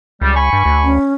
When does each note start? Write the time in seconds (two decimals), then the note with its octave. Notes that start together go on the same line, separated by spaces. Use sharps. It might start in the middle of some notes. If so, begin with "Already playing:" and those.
0.21 C#2 G3
0.35 G#5 B5 C#6
0.53 G2
0.65 D2
0.84 C#4